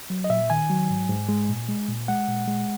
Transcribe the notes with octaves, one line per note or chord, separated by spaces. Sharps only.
F#3
D#5
A#2 E5
D#3 G#5
F#3
G#2
G#2
G#3
A#2
G#3
A#2
G#3 F#5
A#2
G#3